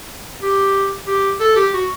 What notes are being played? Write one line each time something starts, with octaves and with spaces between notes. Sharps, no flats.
G4
G4
A4
G4
F#4